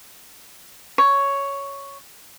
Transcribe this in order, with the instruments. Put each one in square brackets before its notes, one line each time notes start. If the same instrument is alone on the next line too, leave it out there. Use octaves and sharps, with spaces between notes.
[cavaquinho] C#5